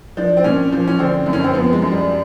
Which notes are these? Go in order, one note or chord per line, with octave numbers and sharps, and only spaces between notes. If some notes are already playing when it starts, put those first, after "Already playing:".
F3 D4
C4
A#2 C#4
F3
C#4
D3 C4
F#2
C#4
C4
F3 B3
G#3
F#2
G3